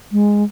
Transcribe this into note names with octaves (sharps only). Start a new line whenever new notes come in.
G#3